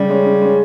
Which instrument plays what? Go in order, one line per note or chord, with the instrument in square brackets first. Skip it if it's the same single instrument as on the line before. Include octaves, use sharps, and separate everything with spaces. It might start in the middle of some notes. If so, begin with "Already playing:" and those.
Already playing: [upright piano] C#3 [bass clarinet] G3
[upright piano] G#3 C#4
C#3
G#3 C#4